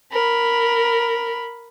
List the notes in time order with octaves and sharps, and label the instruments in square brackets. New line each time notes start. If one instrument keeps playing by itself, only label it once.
[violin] A#4 B5